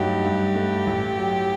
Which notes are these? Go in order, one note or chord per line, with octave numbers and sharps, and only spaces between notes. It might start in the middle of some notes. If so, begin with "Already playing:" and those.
Already playing: G2 F#3 A3 D#4 G4
G2
A3
A1
F#3